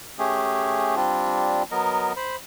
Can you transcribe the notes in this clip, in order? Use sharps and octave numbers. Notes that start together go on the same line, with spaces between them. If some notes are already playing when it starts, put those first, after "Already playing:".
A3 C#4 G4 G#4
G3 C4 D4 F4
F#3 B3 A#4 D#5
C5 B5